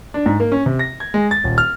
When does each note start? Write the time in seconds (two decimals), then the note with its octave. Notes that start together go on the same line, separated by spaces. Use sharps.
0.14 D4
0.26 G#2
0.40 A#3
0.52 C#4
0.66 C3
0.79 A#6
1.00 G#6
1.14 G#3
1.31 A6
1.44 D#1
1.58 F6